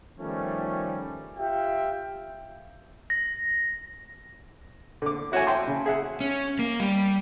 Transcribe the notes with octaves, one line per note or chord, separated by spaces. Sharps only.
D#3 F3 G3 A3 C#4
F4 G4 E5 F5 G5
A#6
D3 D6
E4 F#4 C#5 F#5 G#5
E5 G5 A5 C6
C#3
G#4 E5 F#5
C#4
A#3
G3